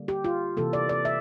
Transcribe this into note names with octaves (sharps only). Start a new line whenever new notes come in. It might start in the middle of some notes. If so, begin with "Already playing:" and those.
Already playing: D3 G3 A#3
G4
F4
C3 E3 A#3 A4
D5
D5
E5